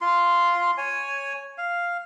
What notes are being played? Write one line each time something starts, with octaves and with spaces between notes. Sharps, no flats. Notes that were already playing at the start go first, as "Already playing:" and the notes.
F4 C6
C#5 G#5
F5